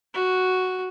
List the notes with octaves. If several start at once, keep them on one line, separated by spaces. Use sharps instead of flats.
F#4